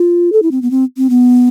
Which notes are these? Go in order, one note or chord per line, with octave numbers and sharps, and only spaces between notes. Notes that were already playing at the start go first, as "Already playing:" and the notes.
Already playing: F4
A4
E4
C4
B3
C4
C4
B3